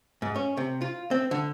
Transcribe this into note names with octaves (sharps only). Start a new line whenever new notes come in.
G#2
C#4
C3
F4
C4
D3